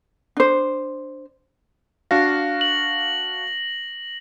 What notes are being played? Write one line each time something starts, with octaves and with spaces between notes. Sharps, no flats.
D4 C5
D4 F#4 F5 A#6
F#7